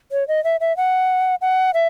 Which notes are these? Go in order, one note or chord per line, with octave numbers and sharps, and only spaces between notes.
C#5
D#5
E5
E5
F#5
F#5
E5